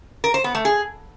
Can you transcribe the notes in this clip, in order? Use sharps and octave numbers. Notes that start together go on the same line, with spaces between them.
A#4
C5
B3
A3
G#4